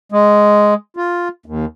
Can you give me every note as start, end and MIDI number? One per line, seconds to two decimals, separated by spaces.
0.12 0.74 56
0.97 1.28 65
1.46 1.65 39